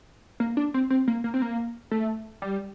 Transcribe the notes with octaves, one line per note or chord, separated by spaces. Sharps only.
A#3
D4
C4
C4
A#3
A#3
C4
A#3
A3
G3